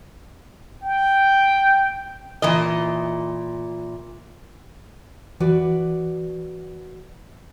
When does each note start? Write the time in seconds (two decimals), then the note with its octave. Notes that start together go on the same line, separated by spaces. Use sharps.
0.83 G5
2.42 A#2 E3 D#5
5.40 E3 F#4 B4 D5